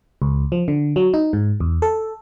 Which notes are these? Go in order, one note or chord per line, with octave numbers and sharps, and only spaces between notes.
C#2
F3
D3
F#3
D#4
G#2
E2
A4